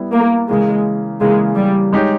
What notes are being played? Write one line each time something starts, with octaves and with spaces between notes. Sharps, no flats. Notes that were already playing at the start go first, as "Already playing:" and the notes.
Already playing: G3 B3 E4
A#3
C#3 E3 G#3 A#3
C#3 E3 G#3 A#3
G3
G#3 D#4 G4 C#5